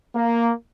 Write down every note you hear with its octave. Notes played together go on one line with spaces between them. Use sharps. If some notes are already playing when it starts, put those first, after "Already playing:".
A#3